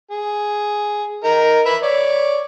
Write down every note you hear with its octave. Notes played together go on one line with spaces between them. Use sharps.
G#4
D#4 A#4
B4 E5 B5
C#5 D5